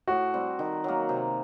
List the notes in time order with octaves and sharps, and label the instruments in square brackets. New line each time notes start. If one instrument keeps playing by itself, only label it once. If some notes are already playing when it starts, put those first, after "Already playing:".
[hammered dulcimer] A2 [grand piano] F#4
[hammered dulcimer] G3 C4
D#3
F#3 A#3
C3